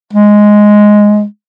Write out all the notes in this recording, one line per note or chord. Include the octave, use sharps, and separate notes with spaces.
G#3